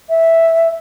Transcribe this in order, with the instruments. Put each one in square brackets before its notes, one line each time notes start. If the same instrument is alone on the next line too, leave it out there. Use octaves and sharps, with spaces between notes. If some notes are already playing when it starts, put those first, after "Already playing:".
[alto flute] E5